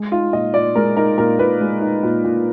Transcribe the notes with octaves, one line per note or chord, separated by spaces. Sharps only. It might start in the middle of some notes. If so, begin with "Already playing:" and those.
Already playing: G#3
D#4 F4
A#2 D#5
A#2 D5
G#3 A#4
D#4 A#4
A#2 A#4
A#2 B4
G#3
D#4
A#2
A#2